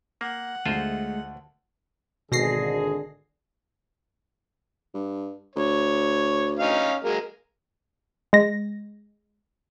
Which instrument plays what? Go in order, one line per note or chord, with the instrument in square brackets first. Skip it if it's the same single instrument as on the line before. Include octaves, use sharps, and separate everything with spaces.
[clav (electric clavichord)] A#3 [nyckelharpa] F#5
[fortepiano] D2 [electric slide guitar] G#3 A3 [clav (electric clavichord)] F4 C5
[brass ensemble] G#1 D3 G#4 [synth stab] B2 A#6 C7
[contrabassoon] G2
[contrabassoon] D2 [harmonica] C#5
[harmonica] C#4 D#4 F5
F#3 G#3 A#3
[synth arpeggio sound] G#3 A#6